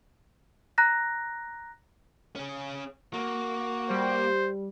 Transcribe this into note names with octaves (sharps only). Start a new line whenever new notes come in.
A#5 F#6 A#6
C#4 G#4
A#3 F#4
G3 C5